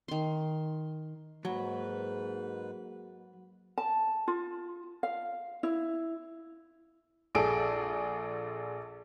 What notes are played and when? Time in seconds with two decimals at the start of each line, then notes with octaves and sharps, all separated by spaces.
0.08 D#3 C6
1.45 G#2 F#3 A#3 F#4 B4 F#5
3.78 A5
4.28 F4
5.03 F5
5.63 E4
7.35 A#1 G#4 A4 G#5 D7